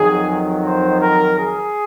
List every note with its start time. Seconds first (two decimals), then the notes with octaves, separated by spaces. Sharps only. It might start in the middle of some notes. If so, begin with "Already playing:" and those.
Already playing: F2 D#3 F#3 G#4
0.66 C5
1.02 A#4
1.39 G#4